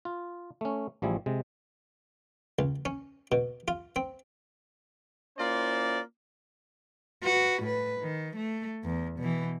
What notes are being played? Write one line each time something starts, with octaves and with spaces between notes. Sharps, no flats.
F4
A3 C#4
A1 F3 G3 E4 G#4
C3 G#3
C#2
C#4
B2
F4
C4
A#3 C#4 E4 F4 C5 D5
F#4 B4
A2 B4
D#3
A3
E2
B2 E3